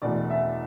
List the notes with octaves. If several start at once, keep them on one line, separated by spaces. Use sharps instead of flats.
E1 E2 B2 A3 D5
E5